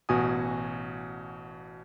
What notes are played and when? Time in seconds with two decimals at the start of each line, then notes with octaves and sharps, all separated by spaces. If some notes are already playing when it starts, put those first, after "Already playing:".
0.09 A1 B2 F#4 G#5 D#6